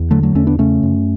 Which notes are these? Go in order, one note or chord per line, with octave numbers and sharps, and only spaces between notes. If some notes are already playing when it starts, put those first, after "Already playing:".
Already playing: E2
D3 F#3 A3
F#3 A3
E2 A3 C#4
B3 D4
C#3 A3 C#4
F#2